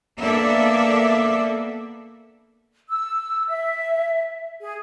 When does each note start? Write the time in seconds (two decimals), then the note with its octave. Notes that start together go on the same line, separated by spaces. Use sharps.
0.20 A#3 B3 D4 A4 D5 E5
2.89 E6
3.48 E5
4.61 G#4